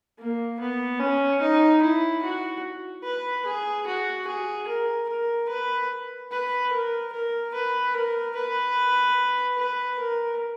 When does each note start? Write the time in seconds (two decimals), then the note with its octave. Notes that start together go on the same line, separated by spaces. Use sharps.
0.18 A#3
0.60 B3
1.00 C#4
1.41 D#4
1.82 E4
2.22 F#4
3.04 B4
3.45 G#4
3.86 F#4
4.27 G#4
4.67 A#4
5.08 A#4
5.49 B4
6.31 B4
6.72 A#4
7.12 A#4
7.54 B4
7.94 A#4
8.35 B4
9.58 B4
9.99 A#4